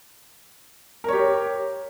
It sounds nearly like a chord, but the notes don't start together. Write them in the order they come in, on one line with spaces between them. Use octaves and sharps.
A#4 C#5 G4